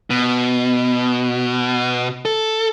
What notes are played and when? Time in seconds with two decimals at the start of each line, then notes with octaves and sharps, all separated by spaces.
0.10 B2
2.25 A4